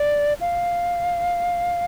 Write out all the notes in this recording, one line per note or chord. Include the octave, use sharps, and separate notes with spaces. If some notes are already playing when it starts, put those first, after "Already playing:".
Already playing: D5
F5